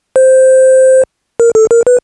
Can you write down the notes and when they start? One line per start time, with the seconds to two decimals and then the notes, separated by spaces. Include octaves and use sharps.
0.16 C5
1.40 A#4
1.55 A4
1.71 A#4
1.87 B4